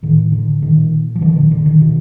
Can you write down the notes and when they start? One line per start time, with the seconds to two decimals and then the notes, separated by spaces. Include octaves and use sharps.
0.03 A2 D#3
0.32 D3
0.62 A#2 D#3
1.15 F3
1.21 A#2 D3 E3
1.36 D#3
1.51 D3
1.66 D#3
1.81 B2